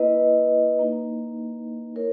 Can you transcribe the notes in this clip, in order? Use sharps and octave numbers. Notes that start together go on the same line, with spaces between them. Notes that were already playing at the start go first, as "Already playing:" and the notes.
Already playing: A#3 E4 B4 D#5
A#3 D#4
E4 A#4 C#5